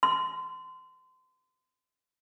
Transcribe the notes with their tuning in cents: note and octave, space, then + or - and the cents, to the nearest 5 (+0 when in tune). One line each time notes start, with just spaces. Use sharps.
C6 -30